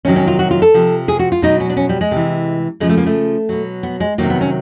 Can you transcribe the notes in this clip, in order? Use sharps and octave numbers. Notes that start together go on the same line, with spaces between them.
C3 D#3 F#3 C#4
C#4
F4
F#4
F4
A4
C3 F3
G#4
F#4
F4
B2 F#3 D#4
C#4
D4
C#4
G3
G#3
C3 E3
C#3 F3 G#3
A3
A#3
A3
B2 F#3
B3
G#3
C3 D#3 F#3 A#3
B3
C#4